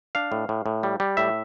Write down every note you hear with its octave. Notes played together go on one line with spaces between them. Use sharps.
D4 F5
A2
A2
A2
G3
G3
A2 E5